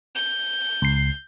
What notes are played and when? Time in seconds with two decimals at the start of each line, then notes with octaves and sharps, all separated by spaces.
0.15 G6
0.82 C#2 C7